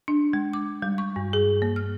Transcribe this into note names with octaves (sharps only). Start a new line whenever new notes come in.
D4
G#3
D6
G3
C#6
G2
G#4
A#3
F6